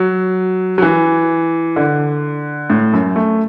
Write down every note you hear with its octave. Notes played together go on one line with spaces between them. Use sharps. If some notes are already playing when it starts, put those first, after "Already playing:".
Already playing: F#3
F#3
E3
D3
A2
F#2
A3